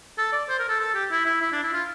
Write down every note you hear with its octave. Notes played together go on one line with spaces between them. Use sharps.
A4
D5
C5
A#4
A4
A4
G4
E4
E4
E4
D4
E4
F4